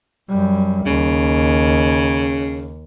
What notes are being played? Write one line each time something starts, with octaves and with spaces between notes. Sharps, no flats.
F#2 G3
D#2 C#3